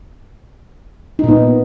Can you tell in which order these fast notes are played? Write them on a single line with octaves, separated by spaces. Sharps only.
D#4 A#2 B3